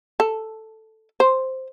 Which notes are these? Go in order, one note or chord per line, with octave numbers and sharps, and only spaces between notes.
A4
C5